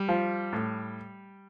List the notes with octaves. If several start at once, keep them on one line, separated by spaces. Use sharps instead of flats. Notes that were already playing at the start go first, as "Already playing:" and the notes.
Already playing: G3
F3
A2